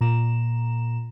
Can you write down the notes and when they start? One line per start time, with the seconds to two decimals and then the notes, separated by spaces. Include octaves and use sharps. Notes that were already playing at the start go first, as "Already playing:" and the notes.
0.01 A#2 A#5 E7